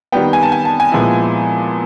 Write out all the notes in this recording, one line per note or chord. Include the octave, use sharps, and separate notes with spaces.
D#3 G3 B3 G5
G#5
A5
G#5
A5
G#5
A#2 F3 G#3 B3 E4